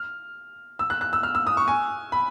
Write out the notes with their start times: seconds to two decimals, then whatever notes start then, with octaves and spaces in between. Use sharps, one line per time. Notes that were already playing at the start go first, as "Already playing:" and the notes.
Already playing: F6
0.79 E6
0.90 F#6
1.01 F#6
1.13 E6
1.23 F6
1.35 E6
1.47 D#6
1.57 C#6
1.68 G#5
2.12 B5